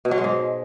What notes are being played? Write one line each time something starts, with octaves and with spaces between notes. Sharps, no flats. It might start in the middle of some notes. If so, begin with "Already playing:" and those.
B2
F#3
G#3
G#2